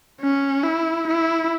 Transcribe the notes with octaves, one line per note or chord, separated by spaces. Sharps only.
C#4
E4
E4